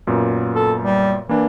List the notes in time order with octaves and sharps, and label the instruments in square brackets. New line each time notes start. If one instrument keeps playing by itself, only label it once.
[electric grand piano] F#2 A#2 B3
[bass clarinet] A4
G3
[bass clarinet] E3 [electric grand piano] A#3 D4